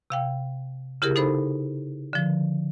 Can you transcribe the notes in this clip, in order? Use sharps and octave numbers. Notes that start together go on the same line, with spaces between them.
C3 F5 G5
C#3 E4 G4 G#4 A#4
D#4 A4 C5 B5
D3 F3